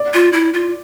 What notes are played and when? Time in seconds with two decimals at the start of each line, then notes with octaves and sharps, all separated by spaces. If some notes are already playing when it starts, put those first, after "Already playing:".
Already playing: D5
0.14 F4
0.33 E4
0.54 F4